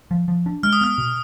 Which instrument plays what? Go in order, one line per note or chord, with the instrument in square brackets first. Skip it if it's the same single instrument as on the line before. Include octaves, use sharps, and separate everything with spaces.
[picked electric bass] F3
F3
D4
[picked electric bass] G#3 [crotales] F6
[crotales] D#6
[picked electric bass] B3 [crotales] F6
[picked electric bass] B2